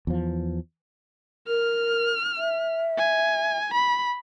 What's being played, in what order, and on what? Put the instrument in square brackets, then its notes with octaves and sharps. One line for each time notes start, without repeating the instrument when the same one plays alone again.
[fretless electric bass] E2 F3
[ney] A#4 [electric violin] F6
[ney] E5
[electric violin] G#5
B5